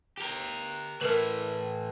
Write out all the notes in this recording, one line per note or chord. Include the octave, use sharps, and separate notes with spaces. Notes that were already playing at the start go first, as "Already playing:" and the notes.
G4 A#4
A2 E3 A#4 B4